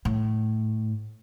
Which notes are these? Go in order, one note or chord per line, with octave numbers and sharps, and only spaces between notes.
A2